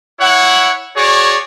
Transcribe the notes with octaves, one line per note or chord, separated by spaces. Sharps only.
E4 C#5 F#5
F#4 G#4 C#5 D5